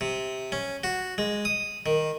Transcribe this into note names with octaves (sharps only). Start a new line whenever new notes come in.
C3
C#4
F#4
G#3
D#6
D#3